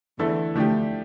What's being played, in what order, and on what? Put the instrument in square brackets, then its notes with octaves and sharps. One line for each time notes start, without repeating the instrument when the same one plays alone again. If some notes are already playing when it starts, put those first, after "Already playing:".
[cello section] E2 E3 [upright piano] D3 A3 E4 A4
[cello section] D2 D3 [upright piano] F3 A3 D4 G4